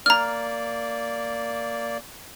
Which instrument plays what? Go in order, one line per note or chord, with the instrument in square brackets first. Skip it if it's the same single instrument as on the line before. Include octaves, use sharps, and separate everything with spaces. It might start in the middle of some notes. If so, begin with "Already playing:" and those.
[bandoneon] A#3 D5 [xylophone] A#5 F6